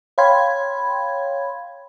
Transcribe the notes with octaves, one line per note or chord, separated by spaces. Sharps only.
C#5 F5 G5 B5 C6 G#6